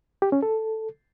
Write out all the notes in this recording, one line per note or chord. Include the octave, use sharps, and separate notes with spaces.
G4
C#4
A4